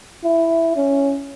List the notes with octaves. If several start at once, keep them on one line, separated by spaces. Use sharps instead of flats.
E4
C#4